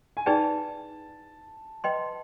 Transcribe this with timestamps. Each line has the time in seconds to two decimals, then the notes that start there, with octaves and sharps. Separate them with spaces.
0.17 G#5
0.26 D#4 G#4 B4 D5 G5 A5
1.84 B4 D#5 G5 C6